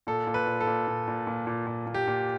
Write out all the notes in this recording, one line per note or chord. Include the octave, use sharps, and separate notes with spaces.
A#2 A4
A#2
B4
A#2
A4
A#2
A#2
A#2
A#2
A#2
A#2
A#2
G4
A#2